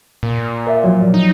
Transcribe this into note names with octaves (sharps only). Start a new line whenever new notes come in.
A#2
A#4 D5 E5
F3 F#3
D#4